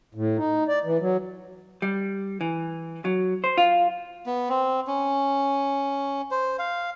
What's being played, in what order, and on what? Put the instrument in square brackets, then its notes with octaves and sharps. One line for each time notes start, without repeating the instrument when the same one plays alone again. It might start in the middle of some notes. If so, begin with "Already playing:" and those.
[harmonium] A2
D#4
D5
E3
F#3
[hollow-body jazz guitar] G3
E3
F#3
C5
F4
[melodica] B3
C4
C#4
C5
F5